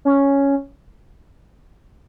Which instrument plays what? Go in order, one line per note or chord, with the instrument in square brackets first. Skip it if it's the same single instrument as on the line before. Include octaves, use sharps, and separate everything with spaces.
[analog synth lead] C#4